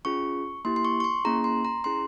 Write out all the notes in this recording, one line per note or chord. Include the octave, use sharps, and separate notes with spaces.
C#4 F4 G#4 C#6
A#3 E4 G4 C6
C6
C#6
C#6
C6
A#3 C#4 E4 G#4 A#5
C6
A#5
C#4 E4 G#4 C6